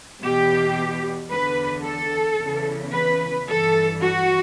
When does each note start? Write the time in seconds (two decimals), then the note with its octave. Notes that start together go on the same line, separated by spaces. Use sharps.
0.22 E2 B2 G4
1.30 E2 D3 B4
1.84 A4
2.39 E2 C#3 E3
2.92 B4
3.46 G2 E3 A4
4.00 F#4